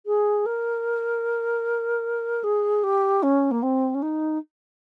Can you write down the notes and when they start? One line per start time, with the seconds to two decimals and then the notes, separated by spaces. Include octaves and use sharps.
0.06 G#4
0.46 A#4
2.43 G#4
2.83 G4
3.22 C#4
3.51 A#3
3.62 C4
3.94 C#4
4.02 D#4